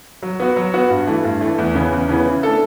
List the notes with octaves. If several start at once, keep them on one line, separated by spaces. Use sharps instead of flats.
F#3
B3 F#4
F#3
B3 F#4
G2
E3 A3
G2
E3 A3
E2
C#3 E3 B3
E2
C#3 E3 B3
E3
A3 D4 A4